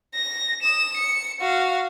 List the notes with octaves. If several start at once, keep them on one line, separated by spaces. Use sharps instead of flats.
A#6
D#6 E7
C#7
F#4 F5